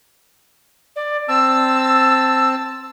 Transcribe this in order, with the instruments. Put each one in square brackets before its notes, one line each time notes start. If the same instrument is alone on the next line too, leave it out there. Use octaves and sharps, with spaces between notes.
[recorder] D5
[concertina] C4 A5 [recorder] E6